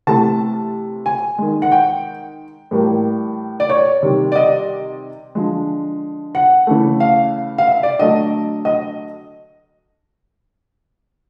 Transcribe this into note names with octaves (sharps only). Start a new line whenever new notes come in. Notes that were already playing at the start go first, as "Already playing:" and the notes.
C3 E3 A3 A5
G#5
D#3 G#3
F#5
G5
A2 E3 G3 A#3
D5
C#5
C3 D#3 G3
D5
D#5
D3 F3 G#3
F#5
C#3 E3 A3
F5
F5
E5
D5
D3 F#3 A3 D#5
D#5